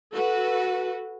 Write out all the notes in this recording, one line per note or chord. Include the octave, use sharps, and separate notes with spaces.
F#4 A4 B4